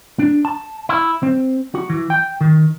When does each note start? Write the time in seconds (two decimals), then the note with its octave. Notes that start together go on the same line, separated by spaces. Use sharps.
0.19 D4
0.45 A5
0.89 E4
1.23 C4
1.75 F#4
1.90 E3
2.10 G5
2.41 D#3